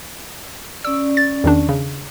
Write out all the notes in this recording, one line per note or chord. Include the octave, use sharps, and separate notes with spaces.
C#4 D5 E6
A6
E2 D#3 D4
C#3